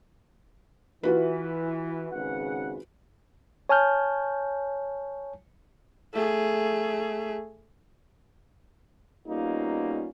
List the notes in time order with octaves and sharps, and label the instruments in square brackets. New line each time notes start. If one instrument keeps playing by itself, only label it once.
[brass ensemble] E3 [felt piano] F4 F#4 B4
[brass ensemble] G#1 C#3 F#5
[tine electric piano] C#5 G#5 A5 F6 G6
[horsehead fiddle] A3 G#4
[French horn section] B2 G3 A#3 C#4 D#4 F4